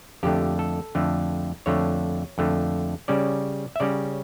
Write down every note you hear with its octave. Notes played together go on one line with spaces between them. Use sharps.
F2 D3 A3 G4
A4
F2 D3 A3
F2 D3 A3 C#5
F2 D3 A3
C#3 G3 C#4 D5
E5
C#3 G3 C#4 D5